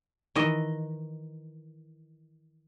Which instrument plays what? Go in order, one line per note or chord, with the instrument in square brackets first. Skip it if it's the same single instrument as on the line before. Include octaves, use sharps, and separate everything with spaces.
[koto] D#3 E3 D#5